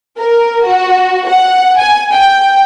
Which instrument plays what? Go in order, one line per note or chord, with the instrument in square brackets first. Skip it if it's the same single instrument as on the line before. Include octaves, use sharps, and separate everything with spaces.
[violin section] A#4
F#4
F#5
G#5
G5